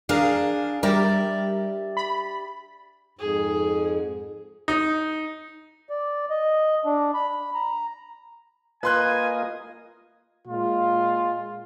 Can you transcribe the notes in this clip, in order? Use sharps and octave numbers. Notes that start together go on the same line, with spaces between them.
D4 G#4 A#4 F5
G3 G4 A#4 D5 E5
B5
F2 G#2 G#4
D#4
D5
D#5
D4
B5
A#5
A#3 F4 B4 D#5 G#5 C6 F#6
A#2 G#3 F4